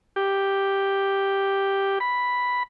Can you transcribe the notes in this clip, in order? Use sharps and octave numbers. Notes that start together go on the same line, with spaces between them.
G4
B5